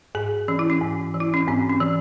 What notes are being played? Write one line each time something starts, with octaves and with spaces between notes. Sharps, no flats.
G#2 G#4
E3 C#4
E4
C#4
G#2
E3
E4
C#4
G#2 C4
C#4
E3